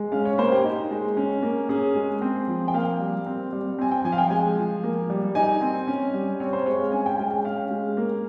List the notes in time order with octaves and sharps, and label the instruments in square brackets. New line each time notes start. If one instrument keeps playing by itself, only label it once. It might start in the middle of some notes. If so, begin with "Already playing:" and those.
Already playing: [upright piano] G#3
C#4 F5
C#5
A#3 C5
G4
D#4
G#3
C#4
A#3
C#4 G#4
G#3
C4
F3
G5
A#3 F5
G3
C4
G3
C4 G#5
G5
F3 G#5
F5
G5
G#3 G#5
F3
A#3
G3
D#4 G#5
C4
C#4
G3
C4 C#5
C5
G#3 C#5
F5
C#4 G#5
G5
G#3 G5
G5
C#4 F5
G#3
A#3